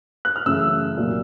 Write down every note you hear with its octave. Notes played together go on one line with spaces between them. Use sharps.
F#6
F6
F#2 C#3 E3 A3 E6
C2 A#2 F#3